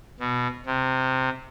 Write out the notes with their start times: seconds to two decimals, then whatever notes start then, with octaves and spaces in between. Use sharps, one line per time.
0.20 B2
0.66 C3